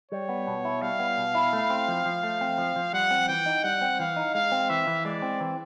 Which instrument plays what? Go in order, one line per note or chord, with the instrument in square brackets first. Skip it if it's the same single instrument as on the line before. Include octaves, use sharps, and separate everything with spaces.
[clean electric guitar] G3 [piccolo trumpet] C#5
[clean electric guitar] B3
B2
E4
[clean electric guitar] G3 [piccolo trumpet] F5
[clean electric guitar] B3
B2
E4
A3
C4
F3
F3
A3
C4
F3
F3
[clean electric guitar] G3 [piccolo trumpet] F#5
[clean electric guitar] C4
[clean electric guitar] E3 [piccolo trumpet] G5
[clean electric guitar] D#4
[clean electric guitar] G3 [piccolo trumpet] F#5
[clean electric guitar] C4
[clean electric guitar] E3 [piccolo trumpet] F5
[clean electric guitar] D#4
[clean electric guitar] G#3 [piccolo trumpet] F5
[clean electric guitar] C4
[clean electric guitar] E3 [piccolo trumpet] E5
[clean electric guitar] E3
[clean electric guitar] G#3 [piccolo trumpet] D5
[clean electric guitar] C4
E3